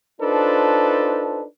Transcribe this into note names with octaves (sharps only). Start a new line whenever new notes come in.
D4 D#4 F4 A4 B4 C5